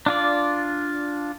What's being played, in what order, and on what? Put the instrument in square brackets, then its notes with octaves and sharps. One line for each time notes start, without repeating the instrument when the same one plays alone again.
[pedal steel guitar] D4 F4 D5